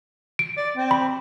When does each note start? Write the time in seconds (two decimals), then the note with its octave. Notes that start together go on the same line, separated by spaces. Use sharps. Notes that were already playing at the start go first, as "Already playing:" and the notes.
0.39 D7
0.58 D5
0.77 C4
0.91 B5